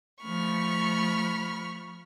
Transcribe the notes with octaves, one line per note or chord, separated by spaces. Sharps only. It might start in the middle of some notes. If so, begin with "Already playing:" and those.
F3 A3 B5 C#6 F6